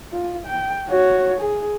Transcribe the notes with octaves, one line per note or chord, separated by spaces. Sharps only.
F4
G5
F#4 C#5
G#4